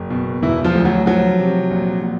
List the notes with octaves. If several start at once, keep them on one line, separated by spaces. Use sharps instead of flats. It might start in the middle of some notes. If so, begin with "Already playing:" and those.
Already playing: F#1
B2
E1 E3 E4
F3 F4
D2
F#3 F#4
F3 F#3 F#4
C3
A#1
A#2